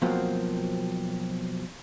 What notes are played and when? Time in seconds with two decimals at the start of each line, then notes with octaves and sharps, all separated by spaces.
0.02 B2 F3 F#3 A#3 C4